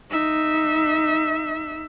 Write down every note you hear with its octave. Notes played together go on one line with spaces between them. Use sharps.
D#4 E5